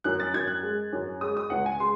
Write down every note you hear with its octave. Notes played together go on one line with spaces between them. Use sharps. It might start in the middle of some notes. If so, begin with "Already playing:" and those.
F#2 F#6
A6
F#2 G#6
F#6
G#3
F#2
G#3 D#6
D#6
C#2 F#5
G#5
G#3 C6